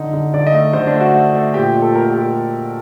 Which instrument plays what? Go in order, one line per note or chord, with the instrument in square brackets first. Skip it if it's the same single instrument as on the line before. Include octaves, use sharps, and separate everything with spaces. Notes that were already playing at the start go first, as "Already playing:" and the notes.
Already playing: [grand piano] D3 D#4
D3
D3 D5
D#5
A3
D3 C5
D4
A3
F#4
A3
A3
A#2 G4
A#2
A4
A3 A#4
G4
A#2
G4